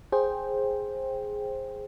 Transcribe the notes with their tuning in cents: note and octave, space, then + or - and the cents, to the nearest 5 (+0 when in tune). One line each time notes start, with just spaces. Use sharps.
G#4 +0 C5 +15 G5 +0